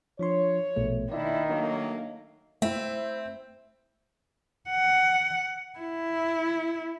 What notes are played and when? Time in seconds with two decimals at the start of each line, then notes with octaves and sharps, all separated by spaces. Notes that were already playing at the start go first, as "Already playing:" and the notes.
0.19 F3 D4 C#5 C6
0.76 A#1 B2 A3
1.12 D#3 A#3 D4 E4 D5
1.48 F#3 A3 A#3 D4
2.62 A3 C4 E4 C5 E5
4.70 F#5
5.79 E4